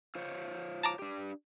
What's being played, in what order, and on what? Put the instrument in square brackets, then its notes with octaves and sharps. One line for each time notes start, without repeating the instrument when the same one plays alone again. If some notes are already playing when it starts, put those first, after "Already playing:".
[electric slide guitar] F4 C5 C#5
[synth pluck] A5 A#5 D6
[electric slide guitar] D4 G4